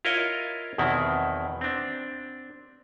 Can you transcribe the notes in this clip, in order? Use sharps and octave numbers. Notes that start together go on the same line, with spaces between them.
E4 F4 A#4 C#5 D#5 F5
E2 B2 D#3 C4 E4
C4 D4